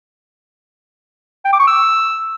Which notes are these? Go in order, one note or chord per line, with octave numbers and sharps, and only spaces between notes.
G5
D6
C#6
E6